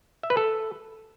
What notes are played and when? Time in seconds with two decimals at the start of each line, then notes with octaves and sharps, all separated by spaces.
0.23 E5
0.30 B4
0.37 A4